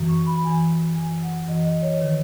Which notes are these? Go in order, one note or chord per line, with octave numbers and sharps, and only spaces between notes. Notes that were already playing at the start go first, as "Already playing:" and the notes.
Already playing: F#2 E3
C#6
B5
F#2 E3 G#5
F#2 E3 G#5
F#5
F#2 E3 D#5
D#5
C#5
D#3 B4